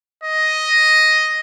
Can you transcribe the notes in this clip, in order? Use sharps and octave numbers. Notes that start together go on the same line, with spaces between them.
D#5